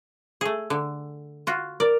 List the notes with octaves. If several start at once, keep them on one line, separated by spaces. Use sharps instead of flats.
A3 G#4
D3
F4 F#4
A#4 D5